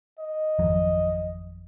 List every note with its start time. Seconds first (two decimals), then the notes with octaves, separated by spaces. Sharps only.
0.20 D#5
0.59 G#1 F2 F#3